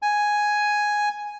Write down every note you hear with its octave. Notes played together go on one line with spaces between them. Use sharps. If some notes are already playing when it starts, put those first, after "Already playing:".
G#5